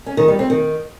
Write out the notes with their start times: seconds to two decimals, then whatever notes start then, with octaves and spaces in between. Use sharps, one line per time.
0.06 C#4
0.17 D#3
0.28 G3
0.39 C4
0.50 D#3